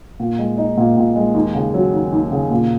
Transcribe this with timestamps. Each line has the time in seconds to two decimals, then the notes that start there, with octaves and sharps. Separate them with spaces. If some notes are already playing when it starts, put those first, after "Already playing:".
0.20 A#2
0.39 G#3
0.58 D#4
0.77 A#2
0.97 A#2
1.16 G#3
1.35 D#2
1.55 C#3
1.74 F#3
1.93 D#2
2.12 D#2
2.32 C#3
2.51 A#2